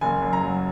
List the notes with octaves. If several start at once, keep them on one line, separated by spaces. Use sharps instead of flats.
F#1 G#5
F#2
A#5
F#3